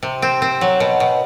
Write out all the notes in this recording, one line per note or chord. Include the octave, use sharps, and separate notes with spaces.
C3
C4
C4
F#3
B2
B2